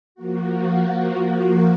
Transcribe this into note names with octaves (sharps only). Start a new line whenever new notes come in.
F3 A#3 F#4